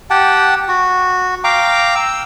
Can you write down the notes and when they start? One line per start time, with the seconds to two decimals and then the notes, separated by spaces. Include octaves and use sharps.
0.10 G4 F#5 G5 A5
0.68 F#4
1.44 F5 G5 A#5 D6
1.95 G5 E6